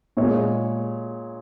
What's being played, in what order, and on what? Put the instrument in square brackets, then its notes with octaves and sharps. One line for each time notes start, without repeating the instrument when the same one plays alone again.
[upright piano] A#2 G#3 C#5